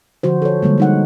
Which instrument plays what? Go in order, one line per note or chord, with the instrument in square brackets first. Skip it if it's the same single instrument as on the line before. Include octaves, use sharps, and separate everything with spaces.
[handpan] D3 F3 F#4 C5
A4 C#5
D3 G3 G#3 A#3
G3 D#4 F#5